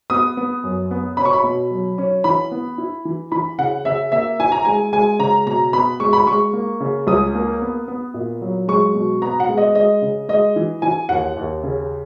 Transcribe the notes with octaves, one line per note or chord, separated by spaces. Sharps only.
B3 D#6
B3
F#2
B3
C#4 B5
C#6
B5
B2
F#3
C#4
E3 B5
B3
E4
E3
E3 B5
C#3 F#5
C#3 E5
A#3 E5
E4 G#5
A#5
G#3 G#5
G#3 G#5
C#3 A#5
B2 A#5
B3 B5
G#3 C#6
B5
G#3 C#6
A#3
C#3
C#2 D#6
A#3
B3
B3
A#2
F#3
G#3 C#6
B2
B3 A#5
F#5
G#3
D#5
G#3 D#5
C#3
G#3 D#5
E3
E3 G#5
D#2 F#5
D#2
C#3